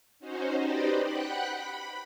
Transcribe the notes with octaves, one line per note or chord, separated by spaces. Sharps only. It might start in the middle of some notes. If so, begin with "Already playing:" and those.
C#4 D#4 F#4 C5
D#4 G4 B4 C5 D5 D#5
F#5 G5 B5 F#6
B5